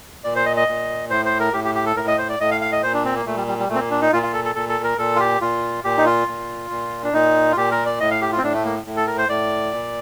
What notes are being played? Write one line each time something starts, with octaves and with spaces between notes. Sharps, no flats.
A#2 D5
C5
D#5
D#5
A#2
A2 C5
C5
A#4
A2 G4
G4
G4
A4
A2 A#4
D#5
C5
D5
A2 D#5
F5
F5
D#5
A#2 C5
D4
C4
A#3
A#2 A3
G3
G3
G3
A#2 A3
C4
A#3
D4
D#4
A#2 F4
F4
A4
A4
A#2 A4
A4
A#4
A#2 A4
F4
G4
A#2 F4
A#2 G4
D#4
F4
A#2
A#2
D4
A#2 D#4
F4
A#2 G4
A#4
D5
A2 D#5
F5
G4
F4
C4
A2 D4
A3
A#3
A2
A4
A#4
C5
A2 D5
A#2